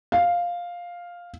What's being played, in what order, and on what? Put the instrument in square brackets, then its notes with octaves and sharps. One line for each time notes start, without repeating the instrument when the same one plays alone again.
[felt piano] F5